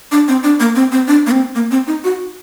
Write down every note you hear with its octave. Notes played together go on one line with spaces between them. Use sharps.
D4
C4
D4
A#3
C4
C4
D4
A#3
C4
A#3
C4
D#4
F#4